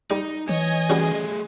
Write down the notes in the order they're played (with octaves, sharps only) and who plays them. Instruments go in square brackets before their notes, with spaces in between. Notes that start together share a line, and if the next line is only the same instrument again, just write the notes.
[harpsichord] G3 [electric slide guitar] D#4
[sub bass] E3 [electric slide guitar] C#5 [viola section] D#5 G#5
[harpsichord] G3 C#4 F#4 [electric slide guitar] A3 G#4